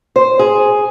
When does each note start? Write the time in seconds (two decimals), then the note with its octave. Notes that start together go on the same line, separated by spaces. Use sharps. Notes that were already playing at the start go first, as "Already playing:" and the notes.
0.16 C5
0.39 G#4